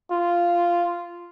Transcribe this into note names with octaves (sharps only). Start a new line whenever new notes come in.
F4